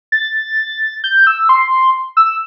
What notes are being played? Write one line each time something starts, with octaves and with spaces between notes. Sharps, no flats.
A6
G6
E6
C6
E6